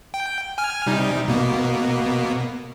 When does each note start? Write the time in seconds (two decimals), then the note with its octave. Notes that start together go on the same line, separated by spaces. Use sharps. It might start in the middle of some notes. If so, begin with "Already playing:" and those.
0.14 G5
0.58 G#5 F6
0.87 C3 G3 D#4
1.28 B2 A#3 B3